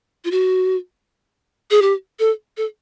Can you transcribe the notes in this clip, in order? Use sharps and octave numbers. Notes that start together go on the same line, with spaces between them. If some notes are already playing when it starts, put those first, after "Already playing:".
F4
F#4
G#4
G4
A4
A4